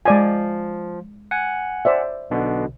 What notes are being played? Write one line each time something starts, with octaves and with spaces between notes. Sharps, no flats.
F3 G#3 D5 G#5
F#5 G#5
C5 D5 E5
B1 B2 D3